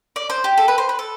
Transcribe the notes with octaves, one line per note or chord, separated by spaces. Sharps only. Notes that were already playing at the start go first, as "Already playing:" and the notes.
D5
C5
G4
A4
B4
C5
B4
A4